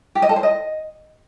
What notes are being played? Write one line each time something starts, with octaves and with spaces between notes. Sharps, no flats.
G4
D#5
A4
C5
D#5